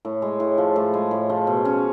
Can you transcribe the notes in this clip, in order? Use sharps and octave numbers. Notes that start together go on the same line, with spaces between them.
A2
G#3
A2
F3
A2
G#3
A2
F3
B2
C#4